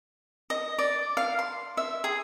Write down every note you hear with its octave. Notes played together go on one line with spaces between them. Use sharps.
D#5
D5
F5
C6
E5
G#4